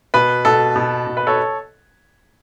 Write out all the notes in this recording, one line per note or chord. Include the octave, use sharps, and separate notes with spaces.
B2 B4
B2 A4
B2
B2
B4
A4 C#5